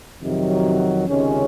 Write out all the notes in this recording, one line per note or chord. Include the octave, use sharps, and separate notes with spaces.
F2 C3 D#3 F#3
C#2 C3 D#3 G#3 C#4